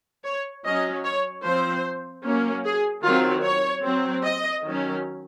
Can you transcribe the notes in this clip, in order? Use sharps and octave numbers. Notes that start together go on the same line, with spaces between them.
C#5
F#3 C#4 D#5
C#5
F3 C4 C5
F#3 A#3 C#4
G#4
D#3 F#3 C4 F4
C#5
F#3 C4
D#5
D#3 F#3 C#4